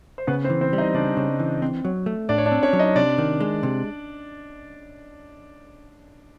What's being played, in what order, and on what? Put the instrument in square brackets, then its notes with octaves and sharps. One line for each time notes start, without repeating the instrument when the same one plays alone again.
[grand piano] C5
[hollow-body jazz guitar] C#3 [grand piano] B3 B4
[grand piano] C4 C5
[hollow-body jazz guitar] E3
[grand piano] C4 C5
[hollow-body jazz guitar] G3
[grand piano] D#4 D#5
[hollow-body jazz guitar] C#3 [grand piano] D4 D5
[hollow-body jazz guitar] C#3
E3
C4
F#3
A3
[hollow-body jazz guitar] A2 [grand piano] D4 D5
[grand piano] C#5
D4 D5
[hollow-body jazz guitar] C4
[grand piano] C#4 C#5
[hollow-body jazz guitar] F#3
[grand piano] D#4 D#5
[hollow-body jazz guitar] C3 [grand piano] D4 D5
[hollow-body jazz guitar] D#3
G#3
C3